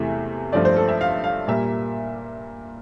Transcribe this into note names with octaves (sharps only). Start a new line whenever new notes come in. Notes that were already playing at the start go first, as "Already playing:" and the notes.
Already playing: E2 C3 E3 A3 E5
G2 F3 A3 D5
C5
A4
E5
F5
F5
A#2 G3 A#3 E5